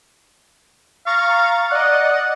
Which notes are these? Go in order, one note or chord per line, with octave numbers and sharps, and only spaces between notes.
F5 A#5 C#6 A6
D5 D#5 F#5